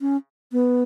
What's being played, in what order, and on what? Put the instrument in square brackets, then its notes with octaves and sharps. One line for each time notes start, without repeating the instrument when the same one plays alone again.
[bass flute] C#4
B3